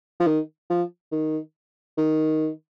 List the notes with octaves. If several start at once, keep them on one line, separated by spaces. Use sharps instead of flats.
F3
D#3
F3
D#3
D#3